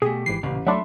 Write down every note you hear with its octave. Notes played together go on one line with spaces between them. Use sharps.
B2 A3 G4 G#4
G#1 E3 C7
A1 A#2 C#3
F#3 A3 D4 E5 B5 C6